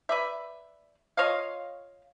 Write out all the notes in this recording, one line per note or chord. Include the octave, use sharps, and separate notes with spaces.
B4 D5 E5
F4 C#5 D#5 F5